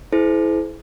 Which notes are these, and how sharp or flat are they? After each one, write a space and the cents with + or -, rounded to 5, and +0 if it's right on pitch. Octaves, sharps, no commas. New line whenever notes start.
E4 -10 G#4 +45 C5 -30